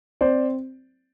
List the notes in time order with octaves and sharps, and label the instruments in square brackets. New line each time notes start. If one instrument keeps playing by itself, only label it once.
[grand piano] C4 C5 D5